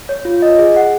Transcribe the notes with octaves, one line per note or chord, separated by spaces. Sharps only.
C#5
F4
D#5
G#4
F#5